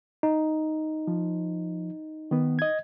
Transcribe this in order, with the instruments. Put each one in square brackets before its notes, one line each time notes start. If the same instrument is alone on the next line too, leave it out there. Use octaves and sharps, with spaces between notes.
[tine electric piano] D#4
[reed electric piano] F3
D#3 B3
D#5 G#6